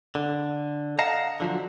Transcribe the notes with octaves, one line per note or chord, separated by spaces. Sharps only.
D3
D#5 F5 F#5 A5 A#5
D3 F3 F#3